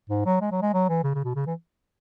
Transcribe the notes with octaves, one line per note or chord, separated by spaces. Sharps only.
G#2
F#3
G#3
F#3
G#3
F#3
E3
C#3
C#3
B2
C#3
E3